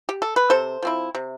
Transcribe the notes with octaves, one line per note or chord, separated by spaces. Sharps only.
G4
A4
B4
C3 A4 C5
F3 C4 E4
C3